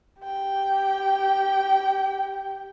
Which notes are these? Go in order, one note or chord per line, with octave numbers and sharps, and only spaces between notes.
G4 G5